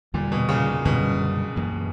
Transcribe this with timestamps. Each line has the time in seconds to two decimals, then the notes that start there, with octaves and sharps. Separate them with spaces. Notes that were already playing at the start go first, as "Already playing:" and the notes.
0.14 E2 A#2 D3 G3
0.32 B2
0.49 A#2 C#3
0.85 F#2 B2 D3 G3 C#4
1.56 F#2 E3 A#3